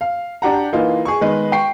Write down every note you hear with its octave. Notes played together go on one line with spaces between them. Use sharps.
F5
D4 G4 F#5 A#5
E3 A#3 D#4 F4
G#4 C#6
D#3 G#3 B3 B4
G5 C#6 C7